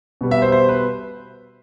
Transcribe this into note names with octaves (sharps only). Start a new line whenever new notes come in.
B2 G3 B3
E5
C5
C5
B4